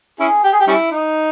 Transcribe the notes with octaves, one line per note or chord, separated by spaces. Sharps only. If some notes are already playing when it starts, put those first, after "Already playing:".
C#4 E4 G#4
G4
G#4
G4
G3 C#4 E4
D#4